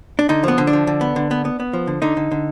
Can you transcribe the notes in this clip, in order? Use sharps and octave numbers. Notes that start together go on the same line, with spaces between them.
D4
D3 D#4
F3 B3
D3
D4
F3
D3
B3
D3
B3
B3
B3
F3
D3
D3 D#4
D3
D3